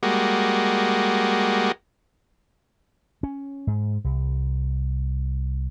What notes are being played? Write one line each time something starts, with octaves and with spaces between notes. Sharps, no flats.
G3 G#3 A#3 F#4
C#4
G#2
C2